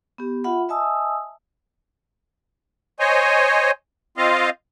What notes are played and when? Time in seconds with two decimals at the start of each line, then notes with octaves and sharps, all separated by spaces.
0.18 B3 G4
0.44 F4 E5 F#5 B5
0.69 D#5 E5 G#5 A5 D#6 E6
3.00 C5 C#5 D#5 G#5
4.17 C4 F4 D#5 F5